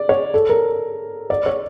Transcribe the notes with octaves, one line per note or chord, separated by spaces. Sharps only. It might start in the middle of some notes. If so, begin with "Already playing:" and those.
Already playing: D5
C#5
A4
A#4
D5
C#5